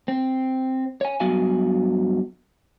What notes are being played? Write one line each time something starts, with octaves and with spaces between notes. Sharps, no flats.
C4
C#5 G#5
G2 F#3 B3 F#4 F5 G#5